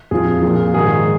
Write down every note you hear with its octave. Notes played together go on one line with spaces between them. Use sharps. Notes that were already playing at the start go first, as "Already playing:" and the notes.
F2 F3 G#4
A#2 F3
G#2 D#3 G#4